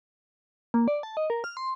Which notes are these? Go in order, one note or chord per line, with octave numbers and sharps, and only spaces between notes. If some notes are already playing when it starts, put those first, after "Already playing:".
A#3
D5
A5
D#5
A#4
F6
C6